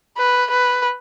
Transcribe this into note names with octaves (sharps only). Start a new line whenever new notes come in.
B4
B4